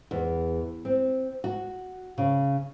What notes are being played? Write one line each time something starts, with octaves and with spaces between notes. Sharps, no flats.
E2
C4
F#4
C#3